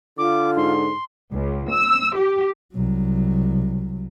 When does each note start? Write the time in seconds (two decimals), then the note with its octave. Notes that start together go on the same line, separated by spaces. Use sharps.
0.18 D3 F4 D6
0.57 G#2 C6
1.32 C#2
1.69 E6
2.17 G4
2.73 C2 F#3